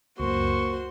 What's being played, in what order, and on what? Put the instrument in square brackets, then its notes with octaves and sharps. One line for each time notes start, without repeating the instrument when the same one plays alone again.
[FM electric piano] C#2 F#2 [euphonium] A#3 [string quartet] F#4 C5 C6 [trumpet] C#6